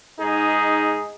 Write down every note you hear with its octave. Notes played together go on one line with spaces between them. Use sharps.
G#2 D#4 G#4